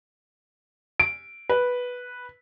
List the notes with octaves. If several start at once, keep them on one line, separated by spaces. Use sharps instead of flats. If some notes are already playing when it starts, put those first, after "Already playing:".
D7
B4